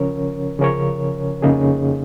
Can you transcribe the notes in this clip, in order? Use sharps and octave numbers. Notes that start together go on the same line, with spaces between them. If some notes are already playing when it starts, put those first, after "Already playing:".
Already playing: C#3 F3 C#4 A#4 C#5
C#3 F3 C#4 A#4 C#5
F2 C#3 A#3 D#4 G#4